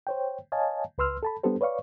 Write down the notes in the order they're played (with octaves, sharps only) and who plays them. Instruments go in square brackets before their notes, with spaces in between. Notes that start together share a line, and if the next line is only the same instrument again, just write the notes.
[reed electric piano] C5 C#5 G5
C#5 D#5 F5 G#5 A5
C#2 B4 C6 E6 F6
A4 A5 B5
G3 B3 D4 G4 A4 C5
B4 C#5 D5 F5 C#6